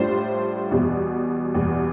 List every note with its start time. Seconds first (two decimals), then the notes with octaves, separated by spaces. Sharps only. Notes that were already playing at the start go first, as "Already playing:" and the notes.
Already playing: A2 G3 D4 F4 C5
0.71 E2 B2 G3
1.55 E2 B2 G3